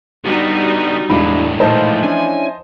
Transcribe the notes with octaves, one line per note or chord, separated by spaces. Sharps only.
D3 G3 B3 D#4 F#4
E1 A2 G#3 D4 E4 F5 B5
A#2 E3 F3 A3 D#4 C5 D#5 A5
C#4 D4 E4 G#5